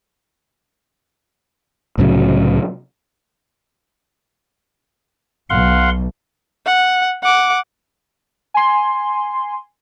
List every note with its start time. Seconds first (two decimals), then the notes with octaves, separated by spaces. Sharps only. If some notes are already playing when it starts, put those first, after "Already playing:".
1.98 C2 A2 C#3 F#3
5.50 B1 F5 F#5 C6
6.66 F#5
7.23 F#5 D6
8.54 G#5 C6